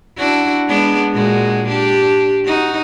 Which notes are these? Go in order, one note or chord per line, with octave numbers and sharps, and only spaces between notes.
D4 E4 F#4
G#3 B3 D4
A#2 G#3 F#4
D4 G4
D#4 F#4